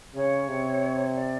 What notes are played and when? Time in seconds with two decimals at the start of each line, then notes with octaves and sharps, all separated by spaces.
0.15 C#3 C#5
0.48 C3
1.14 D5